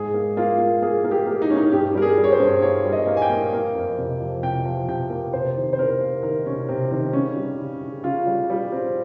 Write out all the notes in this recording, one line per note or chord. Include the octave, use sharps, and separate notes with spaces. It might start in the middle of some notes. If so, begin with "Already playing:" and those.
Already playing: G#2 G#4
A#3
A#3 F4
A#3
A#3 G#4
A#3
G4
A#3
D#4
A#3 C#4
D#4
G2 G4
G3 A#4
G#4
G3
C#5
C5
G2
A#3 C#5
G3
D#5
A#3
G#5
G5
A#3
A#3
F2
C3
F3
C3 G5
F3
C3 G5
A#3
C3 C5
D#3
C5
C3 A#4
A#3
D#3 A#4
C3 C#4
C3 C4
D#3 C4
C#3 C#4
G3
C#3
C#3
C#3 F4
G3
G3
C4